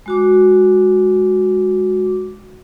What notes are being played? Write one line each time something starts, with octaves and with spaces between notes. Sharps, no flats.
G#3 F#4 D6